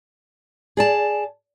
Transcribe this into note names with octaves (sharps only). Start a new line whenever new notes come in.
G#4 D5 A5